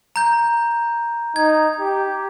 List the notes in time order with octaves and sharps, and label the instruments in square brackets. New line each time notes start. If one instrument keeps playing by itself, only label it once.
[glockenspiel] A#5 G6
[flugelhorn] D#4 [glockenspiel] G#6
[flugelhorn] G4